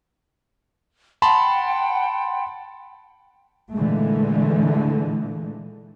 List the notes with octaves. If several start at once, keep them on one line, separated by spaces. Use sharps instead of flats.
F#5 G5 A5 B5 C6
A#2 D3 E3 G#3 A3